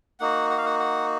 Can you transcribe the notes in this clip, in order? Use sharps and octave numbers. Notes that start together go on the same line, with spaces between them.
A#3 D#4 F#4 F#5
F#5
F5
F#5
F#5